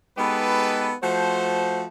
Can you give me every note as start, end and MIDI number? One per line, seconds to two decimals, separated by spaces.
0.18 0.93 56
0.18 0.93 59
0.18 0.93 63
0.18 0.93 67
0.18 0.93 69
0.18 0.93 71
1.03 1.85 53
1.03 1.85 57
1.03 1.85 66
1.03 1.85 72